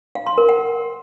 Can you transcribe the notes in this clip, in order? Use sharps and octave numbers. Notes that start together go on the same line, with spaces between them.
F5
C6
A#4
F#5